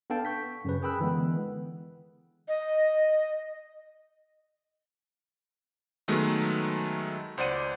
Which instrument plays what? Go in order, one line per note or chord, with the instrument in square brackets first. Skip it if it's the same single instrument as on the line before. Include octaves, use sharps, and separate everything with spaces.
[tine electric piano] B3 D4 A4 F5 G5 A5
C#6 G6 B6
F#2 C#3 B4
G#4 A#4 G5 B5 E6 F#6
D3 E3 G#3 B3
[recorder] D#5
[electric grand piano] D#3 F#3 G#3 A3 B3
C#2 C5 D5 F#5 D#7